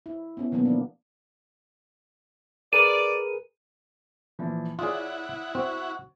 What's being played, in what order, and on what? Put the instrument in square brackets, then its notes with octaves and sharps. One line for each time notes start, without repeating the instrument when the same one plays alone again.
[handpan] E4
B3 C#4 E4
B2 D#3 F#3 A#3 B3
F3 D4
[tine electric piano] G#4 A#4 B4 [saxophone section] D5 [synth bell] D#7
[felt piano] A#2 E3 F3
[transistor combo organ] E4 F#5 [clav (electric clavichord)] F4 G#4 [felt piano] C#5 D5 D#6
[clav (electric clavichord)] C4 [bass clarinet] F#4